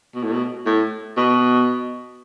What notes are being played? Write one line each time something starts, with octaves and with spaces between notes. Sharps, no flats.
B2
A2
B2
A2
B2